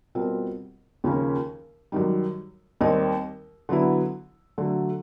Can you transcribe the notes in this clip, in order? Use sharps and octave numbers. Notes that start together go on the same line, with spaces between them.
B2 G3 C4 F4 A#4
D#2 C#3 F3 A#3 C#4
F#2 D#3 G3
D#2 D#3 G3 C4 D#4
D3 F#3 B3 E4
D3 F#3 A3